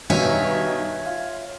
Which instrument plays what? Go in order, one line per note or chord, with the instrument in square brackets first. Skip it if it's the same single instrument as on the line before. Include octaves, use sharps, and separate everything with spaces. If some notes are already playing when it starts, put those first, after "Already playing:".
[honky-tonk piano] G2 B2 D#3 [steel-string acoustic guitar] C#5 E5 G#5
[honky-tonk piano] F4